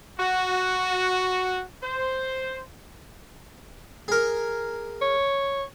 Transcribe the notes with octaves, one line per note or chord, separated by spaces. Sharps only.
F#4
C5
G#4 A#4
C#5